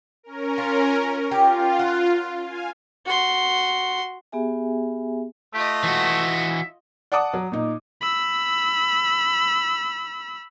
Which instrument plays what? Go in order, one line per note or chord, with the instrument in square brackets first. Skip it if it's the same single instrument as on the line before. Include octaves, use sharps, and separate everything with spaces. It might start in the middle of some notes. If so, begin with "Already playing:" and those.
[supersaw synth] C#4 A#4
[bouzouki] F4
[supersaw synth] F4 [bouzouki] G4
[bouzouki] F#5
[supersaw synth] F5 G#5
[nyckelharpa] F#4 C6
[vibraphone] B3 G4 G#4 E5 G#5
[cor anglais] A3 [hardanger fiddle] F4 D#5 [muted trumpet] G4
[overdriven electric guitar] E3 F#4 [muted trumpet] E5
[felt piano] D5 F#5 A5 D6 D#6
F#3
A#2 D#4
[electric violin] B5 E6